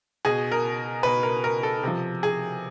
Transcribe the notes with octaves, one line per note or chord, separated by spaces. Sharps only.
B2 G#4
A#4
B2 B4
A#4
A#4
A4
C3 F3
G#4